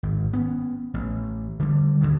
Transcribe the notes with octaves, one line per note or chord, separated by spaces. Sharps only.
G#1
B3 C#4
A1
D3 G3
D#2 B2 D3 D#3